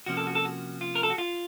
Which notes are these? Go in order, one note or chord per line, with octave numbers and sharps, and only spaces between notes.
C3 F3 A#3 C#4 F#4
A4
F#4
A4
F#4
F4
A#4
A4
F#4
F4